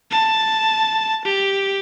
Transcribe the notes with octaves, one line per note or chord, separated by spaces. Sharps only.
A5
G4